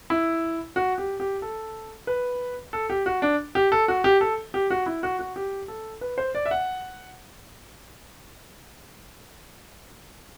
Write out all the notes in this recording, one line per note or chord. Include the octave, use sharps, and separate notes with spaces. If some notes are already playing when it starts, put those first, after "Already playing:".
E4
F#4
G4
G4
A4
B4
A4
G4
F#4
D4
G4
A4
F#4
G4
A4
G4
F#4
E4
F#4
F#4
G4
A4
B4
C5
D5
E5
F#5